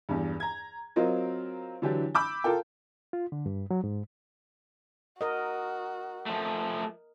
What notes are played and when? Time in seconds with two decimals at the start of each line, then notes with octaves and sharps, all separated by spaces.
0.09 E2 G2
0.40 A#5 G#6
0.96 F#3 C4 F4 A#4 D#5
1.82 D3 E3 F#3 D4 E4 G4
2.15 B5 D6 E6 G6
2.44 F4 A4 A#4 G5
3.13 F4
3.32 D3
3.46 G2
3.71 F#3
3.84 G#2
5.21 F#4 A#4 D#5
6.26 F3 A3